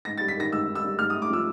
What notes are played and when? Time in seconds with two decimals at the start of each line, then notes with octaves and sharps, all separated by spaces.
0.05 G#2 A#6
0.18 G3 A6
0.28 B6
0.37 D#3 A#6
0.52 G#2 E6
0.67 G#2
0.75 E6
0.84 G3
0.99 G#2 F6
1.10 D#6
1.14 A3
1.22 D6
1.29 F3 E6